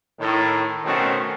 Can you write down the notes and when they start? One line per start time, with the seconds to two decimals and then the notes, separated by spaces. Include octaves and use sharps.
0.20 A2 D#3
0.85 B2 D#3 A3 C4 C#4 F#4